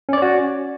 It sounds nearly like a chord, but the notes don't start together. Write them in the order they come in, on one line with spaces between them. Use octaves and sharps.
C#4 D5 C#5 F#4